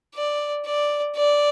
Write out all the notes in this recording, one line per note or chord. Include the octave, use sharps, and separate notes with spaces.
D5
D5
D5